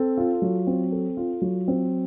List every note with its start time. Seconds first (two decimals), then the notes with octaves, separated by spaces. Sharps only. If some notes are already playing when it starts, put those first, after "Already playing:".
Already playing: C4 A4
0.17 F4
0.42 F#3
0.67 C4
0.92 A4
1.17 F4
1.42 F#3
1.68 C4